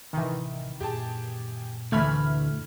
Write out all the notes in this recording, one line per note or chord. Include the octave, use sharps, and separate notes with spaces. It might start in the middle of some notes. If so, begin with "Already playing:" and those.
A1 C3 D#3 E3
F#2 A#2 G4 G#4 A5
D2 E3 A3 B5 F6 G#6